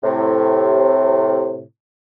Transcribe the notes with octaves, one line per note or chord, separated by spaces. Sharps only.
A2 C3